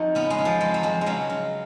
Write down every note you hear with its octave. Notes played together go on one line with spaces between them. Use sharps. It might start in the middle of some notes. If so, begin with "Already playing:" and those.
Already playing: F2 D#4
C#3 B3
G#3
C#3
F3
F2 G#3
F#3
F2 G#3
G#3
C#3 F#3
C#3